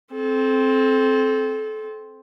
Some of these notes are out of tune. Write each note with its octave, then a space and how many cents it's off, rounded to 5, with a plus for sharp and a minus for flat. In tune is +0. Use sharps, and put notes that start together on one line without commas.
C4 +5 A4 -30